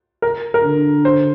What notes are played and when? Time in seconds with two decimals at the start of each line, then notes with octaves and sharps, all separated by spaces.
0.22 A#4
0.54 A#4
0.63 D3
1.05 C5